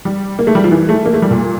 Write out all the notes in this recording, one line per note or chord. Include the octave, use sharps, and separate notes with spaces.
G3
A#3
A3
G3
F3
E3
A3
A#3
A3
G3
A#2